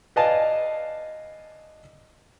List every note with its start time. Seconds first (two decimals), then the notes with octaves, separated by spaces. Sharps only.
0.16 B4 D5 D#5 F5 G#5 A5